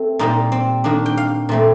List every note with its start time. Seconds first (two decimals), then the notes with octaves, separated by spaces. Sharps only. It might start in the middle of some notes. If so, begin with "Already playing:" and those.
Already playing: A3 C4
0.19 A#2 G3 A#3 D#4
0.52 C4
0.84 D#3 A#3 D4
1.06 G5
1.17 F5
1.49 A#2 A3 C4